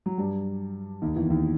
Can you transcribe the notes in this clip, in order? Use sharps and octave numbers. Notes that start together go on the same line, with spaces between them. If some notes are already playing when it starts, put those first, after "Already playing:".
F#3
G2 G3
D#2 D#3
E2 E3
D#2 D#3